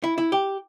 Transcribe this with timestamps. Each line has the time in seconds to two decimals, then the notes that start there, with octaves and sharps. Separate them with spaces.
0.04 E4
0.18 E4
0.32 G4